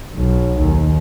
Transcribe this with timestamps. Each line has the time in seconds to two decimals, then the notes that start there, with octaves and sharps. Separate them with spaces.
0.14 B1
0.60 D#2